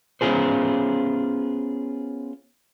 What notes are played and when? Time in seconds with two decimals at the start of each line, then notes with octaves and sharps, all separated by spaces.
0.21 B3 C#4 E4 F4 G#4 C5